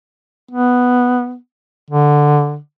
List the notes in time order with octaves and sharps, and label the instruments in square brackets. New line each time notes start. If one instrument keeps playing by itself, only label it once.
[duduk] B3
D3